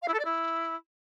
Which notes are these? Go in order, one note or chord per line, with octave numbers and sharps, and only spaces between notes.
F5
E4
A4
D5
E4